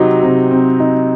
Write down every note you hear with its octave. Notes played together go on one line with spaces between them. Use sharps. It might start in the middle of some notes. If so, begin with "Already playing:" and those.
Already playing: C3 F#3 C4 D#4
C3
C4
D#4